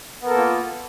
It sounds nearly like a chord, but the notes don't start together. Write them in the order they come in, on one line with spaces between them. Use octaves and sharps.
B3 A#4 A4 A#3 F4